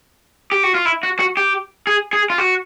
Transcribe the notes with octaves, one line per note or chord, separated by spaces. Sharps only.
G4
F#4
F4
E4
F#4
F#4
G4
G#4
G#4
F4
F#4